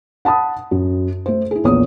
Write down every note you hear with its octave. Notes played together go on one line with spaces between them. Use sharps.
F#5 A5 B5 D#6
F#2
A3 C5
E4 G#4
A#1 E2 C#5 D#6